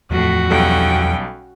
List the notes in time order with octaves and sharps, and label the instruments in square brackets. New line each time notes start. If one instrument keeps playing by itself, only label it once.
[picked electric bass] E2 F3 [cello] A2 [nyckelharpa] F#4
[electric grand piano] B1 G3 A4 [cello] C#4 G5